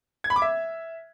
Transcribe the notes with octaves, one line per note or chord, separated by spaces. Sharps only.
G#6
B5
D6
E5